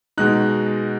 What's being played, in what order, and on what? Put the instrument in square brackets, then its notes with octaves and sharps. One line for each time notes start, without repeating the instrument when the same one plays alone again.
[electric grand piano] B2 G#3 D#4 F#6